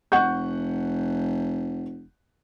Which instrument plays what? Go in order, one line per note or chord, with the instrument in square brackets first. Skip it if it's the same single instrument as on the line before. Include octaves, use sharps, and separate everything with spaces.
[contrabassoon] F1 [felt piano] F#5 C#6 G6